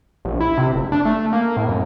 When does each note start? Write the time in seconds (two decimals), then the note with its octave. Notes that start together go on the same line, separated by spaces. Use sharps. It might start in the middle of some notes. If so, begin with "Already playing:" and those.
0.25 A#1
0.40 E4
0.58 C3
0.75 F#1
0.92 D4
1.05 A3
1.33 A#3
1.57 A2
1.69 F#2